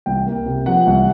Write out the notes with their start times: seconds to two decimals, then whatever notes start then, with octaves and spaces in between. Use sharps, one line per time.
0.06 C2 G5
0.27 A#3
0.46 C3
0.66 F3 F#5
0.87 C2